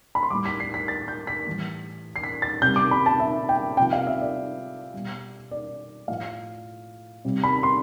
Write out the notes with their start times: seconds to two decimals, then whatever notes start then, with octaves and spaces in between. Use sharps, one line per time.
0.15 B5
0.23 C6
0.30 A2 G3 D6
0.45 B6
0.60 C7
0.74 B6
0.88 A6
1.08 G6
1.27 B6
1.46 A2 E3 G3
2.16 C7
2.24 B6
2.42 A6
2.62 C3 G3 G6
2.76 D6
2.91 B5
3.06 A5
3.20 E5
3.49 G5
3.77 C3 F3 G5
3.93 F5
4.07 E5
4.21 D5
4.94 B2 G3
5.51 D5
6.08 A2 F3 F5
7.25 C3 G3
7.44 B5
7.63 C6